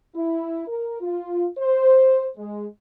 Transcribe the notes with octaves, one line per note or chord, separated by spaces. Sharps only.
E4
A#4
F4
C5
G#3